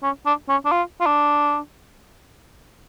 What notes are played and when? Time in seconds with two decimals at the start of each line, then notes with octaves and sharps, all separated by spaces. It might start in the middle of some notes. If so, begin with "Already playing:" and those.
0.03 C#4
0.26 D4
0.49 C#4
0.65 D4
0.72 F4
1.01 F4
1.06 D4